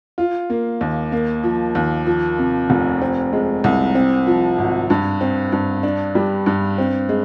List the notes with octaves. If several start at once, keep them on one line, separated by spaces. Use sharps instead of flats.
F4
A#3
D#2
A#3
F3
D#2
F3
C3
F1
C4
G#3
C2
C4
F3
G#1
G2
C4
G2
D4
G3
G2
C4
G#3